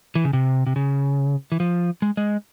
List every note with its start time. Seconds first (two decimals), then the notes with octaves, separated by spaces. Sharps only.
0.15 E3
0.25 C#3
0.33 C3
0.67 C3
0.76 C#3
1.52 E3
1.60 F3
2.02 G#3
2.17 G#3